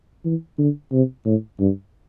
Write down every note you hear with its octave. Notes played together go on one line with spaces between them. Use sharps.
E3
D3
C3
A2
G2